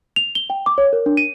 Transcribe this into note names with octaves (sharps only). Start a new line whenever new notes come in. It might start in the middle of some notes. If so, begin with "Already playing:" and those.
F7
G7
G5
D6
C#5
A#4
D4
D#7